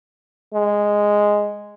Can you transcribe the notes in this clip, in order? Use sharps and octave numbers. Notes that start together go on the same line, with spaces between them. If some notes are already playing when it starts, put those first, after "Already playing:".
G#3